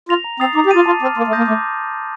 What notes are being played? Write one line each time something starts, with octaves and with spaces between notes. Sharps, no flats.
F4 A#6 F7
A#5
C4 D#6 A6 C7 F7
D#4 D6
G4
F4 A6 D#7
F4 A5
C4 D6 F6
A#3 C6
A3
A#3 D#6 G6 A#6
A3 D6